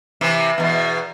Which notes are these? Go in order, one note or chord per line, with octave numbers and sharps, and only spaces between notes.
C3 E3
E2 B2